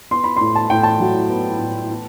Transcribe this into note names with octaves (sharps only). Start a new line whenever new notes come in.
B3 C6
B5
A2 C6
A5
A2 G5
A5
F#3
B3
A2
B3